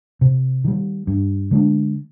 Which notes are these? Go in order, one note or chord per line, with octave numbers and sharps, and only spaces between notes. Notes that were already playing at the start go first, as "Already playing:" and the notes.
C3
D#3 G3
G2
D3 G#3 D4